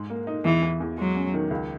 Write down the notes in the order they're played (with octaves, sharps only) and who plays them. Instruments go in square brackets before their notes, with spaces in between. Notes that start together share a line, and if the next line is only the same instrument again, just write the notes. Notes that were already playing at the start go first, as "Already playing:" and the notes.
Already playing: [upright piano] G#2 G#3
A#3
D#4
[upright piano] E2 [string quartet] E3
[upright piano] E2
E2
[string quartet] F#3 [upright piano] G#3
[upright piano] C#4
D#3
C#2